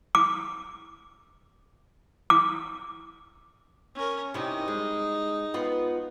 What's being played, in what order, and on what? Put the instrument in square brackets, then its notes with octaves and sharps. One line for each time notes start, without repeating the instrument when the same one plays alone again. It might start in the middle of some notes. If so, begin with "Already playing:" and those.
[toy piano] D6
D6
[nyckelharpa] C#4 A#4
[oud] C3 E4 [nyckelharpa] D#4
[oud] G#3
B3 F4 B4